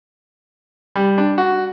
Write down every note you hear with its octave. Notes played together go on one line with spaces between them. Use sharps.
G3
D4
F#4